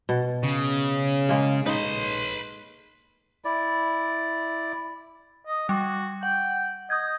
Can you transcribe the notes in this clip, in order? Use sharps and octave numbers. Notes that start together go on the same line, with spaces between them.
B2
C#3
G#3 A#3
D#4 B4 C6
E4 D5
D#5
G3 F#4
F#5 G5
D#5 D#6 G6 G#6